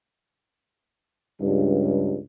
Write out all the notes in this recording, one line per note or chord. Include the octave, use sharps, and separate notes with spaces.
C#2 G2